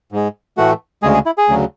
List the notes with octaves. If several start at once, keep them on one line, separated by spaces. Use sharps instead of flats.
G#2 G#3
A2 E3 A3 F#4
D2 C#3 G#3 G#4
G#4
E4
G#4
D2 C#3 F#3